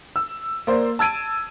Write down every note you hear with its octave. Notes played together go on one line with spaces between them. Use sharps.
E6
A#3 C5 D5
A5 E6 G#6 D7 D#7